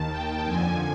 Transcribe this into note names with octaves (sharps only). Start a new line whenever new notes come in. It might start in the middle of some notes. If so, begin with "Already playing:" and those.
Already playing: D#2 D#3 A5
G5
F2 D3 F3 G#5